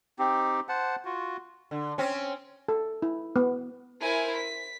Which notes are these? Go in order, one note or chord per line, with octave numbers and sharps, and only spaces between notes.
C4 D#4 G4
C5 F#5 A5
F4 F#4
D3
C4 C#4
A4
E4
B3
E4 A#4 C5 G#5
B6